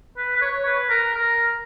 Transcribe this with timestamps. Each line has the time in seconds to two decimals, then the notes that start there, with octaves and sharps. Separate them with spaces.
0.17 B4
0.36 B4
0.42 C#5
0.65 B4
0.90 A#4
1.14 A#4